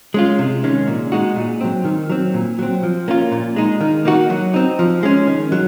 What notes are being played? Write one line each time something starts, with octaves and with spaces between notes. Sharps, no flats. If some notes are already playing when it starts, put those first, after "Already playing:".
G#3 C#4 F4
C3
D#3 G#3 C#4
A#2
G#3 D#4 F#4
A#2
F#3 C4
D#3
F#3 C4
A#2
F#3 C4
F3
A#3 C#4 F4
A#2
G#3 D#4
D#3
A#3 D#4 F#4
F#3
C4 D#4
F3
G#3 C#4
D#3
F#3